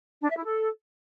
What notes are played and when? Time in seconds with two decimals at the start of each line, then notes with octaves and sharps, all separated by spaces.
0.22 D4
0.30 E5
0.37 E4
0.45 A4